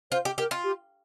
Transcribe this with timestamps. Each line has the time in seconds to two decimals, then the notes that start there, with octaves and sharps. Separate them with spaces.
0.11 F4 C5
0.25 G4
0.38 G4 A#4
0.51 F4
0.64 G4